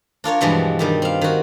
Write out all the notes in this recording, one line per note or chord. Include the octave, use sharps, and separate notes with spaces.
D4 F4 A#4 C#5
G2 B2 E3 F3 G3 G#3
G2 D#3 G3
C4 F5
D#3 F#4